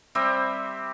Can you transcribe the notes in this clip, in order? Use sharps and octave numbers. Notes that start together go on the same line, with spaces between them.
G3 C4 G4 E5